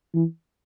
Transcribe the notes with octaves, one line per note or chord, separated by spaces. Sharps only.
E3